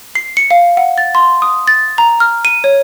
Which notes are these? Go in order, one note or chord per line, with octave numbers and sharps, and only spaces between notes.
C7
C#7
F5
F#5
A6
C6
D#6
A6
A#5
F6
D#7
C#5